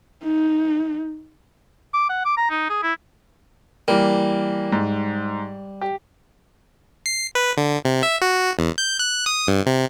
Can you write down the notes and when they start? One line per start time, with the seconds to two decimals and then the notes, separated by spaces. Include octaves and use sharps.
0.24 D#4
1.94 D6
2.09 F#5
2.25 D6
2.37 A#5
2.50 D#4
2.69 G#4
2.83 E4
3.88 E3 G3 A#3
4.72 G#2
5.81 G4
7.06 C7
7.35 B4
7.57 D3
7.85 C3
8.03 E5
8.22 F#4
8.59 E2
8.78 G6
8.99 F#6
9.26 D#6
9.47 G2
9.66 C3